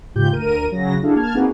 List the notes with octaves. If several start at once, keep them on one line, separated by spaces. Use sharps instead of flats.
G#2 C#3 F4 G4 G6
D2 A#4 D#7
C#3 F#3 A#6
D4 E4 F#4 G#4 A4 F5
A#3 A5 F6 G#6
A#3 C4 D#4 F#4 G#4 B4